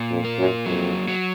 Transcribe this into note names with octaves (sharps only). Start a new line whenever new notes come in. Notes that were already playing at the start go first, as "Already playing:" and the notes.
Already playing: A#2
F2
A#3
F#2
F2 F#3
F#3